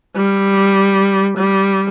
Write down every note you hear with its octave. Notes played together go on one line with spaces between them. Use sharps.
G3
G3